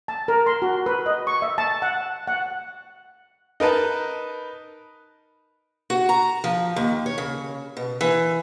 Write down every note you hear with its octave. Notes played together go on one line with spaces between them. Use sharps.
A5
A#4
C6
F#4
B4
D#5
C#6
E5
A5
F#5
F#5
D#4 A#4 B4 A5
F#4
A#5
F3
D#2
C#5
C#3
B2
E3